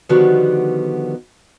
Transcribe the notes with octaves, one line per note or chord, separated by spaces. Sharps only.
D3 D#3 F3 G3 B3 F#4